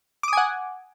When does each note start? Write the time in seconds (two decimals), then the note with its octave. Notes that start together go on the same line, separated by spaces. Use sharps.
0.23 D6
0.28 D#6
0.33 G#5
0.37 F#5